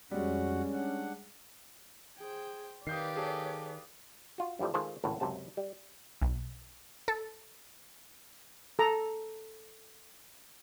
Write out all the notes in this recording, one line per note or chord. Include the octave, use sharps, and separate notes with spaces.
F2 G3 G#3 C#4 F#4 F#5
D4 F#5
G#4 C5 G5
D#3 G4 B4 D5 F5 D#6 G6 C7
G#4 A4 C#5
F4 F#4
G2 E3 F3 G3 A3
D#3 G#3 F4 A4 C5
G#1 C#2 A2
C#2 F#2 C3 A5
G3
B1
A4
A4 A#5